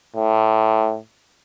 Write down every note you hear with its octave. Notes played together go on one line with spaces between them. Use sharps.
A2